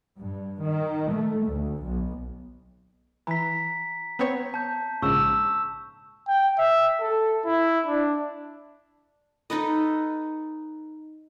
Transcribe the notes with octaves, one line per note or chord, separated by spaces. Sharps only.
G2
D#3
A3
D2
B1
E3 A#5 B6
B3 C4 C#5
A5 G6
A#1 G#2 C#3 C#6 E6 E7
G5
E5
A4
E4
D4
D#4 A4 B4 D#5